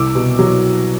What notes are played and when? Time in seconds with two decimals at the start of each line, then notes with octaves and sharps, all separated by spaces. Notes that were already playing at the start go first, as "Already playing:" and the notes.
Already playing: C2 D6 E6
0.15 B2
0.39 F#3